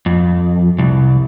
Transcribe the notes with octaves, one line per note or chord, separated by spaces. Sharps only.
F2
C2